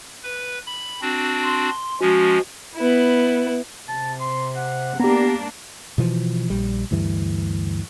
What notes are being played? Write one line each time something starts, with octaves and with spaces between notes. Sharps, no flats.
B4
B5
C4 D4 F#4
C6
F3 G#3 C#4 F#4
B3 E4
C3 A5
C6
F#5
A#3 B3 D4 G4 A#5
B2 E3 F3
A#1 G3
D2 G2 E3